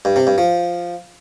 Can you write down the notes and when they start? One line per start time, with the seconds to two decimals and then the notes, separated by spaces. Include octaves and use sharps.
0.05 G2
0.16 C3
0.27 G2
0.38 F3